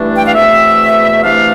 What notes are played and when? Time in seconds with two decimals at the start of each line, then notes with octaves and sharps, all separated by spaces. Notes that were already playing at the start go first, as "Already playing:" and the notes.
Already playing: G2 E3 A3 D4
0.17 G5
0.26 F5
0.35 E2 B2 A3 C4 E5
1.24 C3 E3 A3 D4 F5